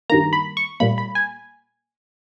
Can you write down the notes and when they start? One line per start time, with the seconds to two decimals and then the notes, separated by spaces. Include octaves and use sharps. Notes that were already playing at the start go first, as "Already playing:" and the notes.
0.10 G2 D#3 A#3 A#5
0.33 B5
0.57 C#6
0.80 A#2 G3 A#3 B5
0.98 B5
1.15 G#5